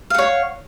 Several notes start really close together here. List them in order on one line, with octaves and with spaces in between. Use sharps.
F5 F#5 C#5